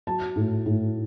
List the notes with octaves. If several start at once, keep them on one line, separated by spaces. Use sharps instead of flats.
F#3 A5
A2
A2